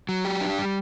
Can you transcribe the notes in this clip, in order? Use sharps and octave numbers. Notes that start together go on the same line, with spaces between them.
F#3
G4
D4
G3